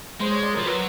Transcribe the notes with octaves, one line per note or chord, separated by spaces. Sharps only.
G#3 C5
C#5
D5
F3 A#4
F#3 B4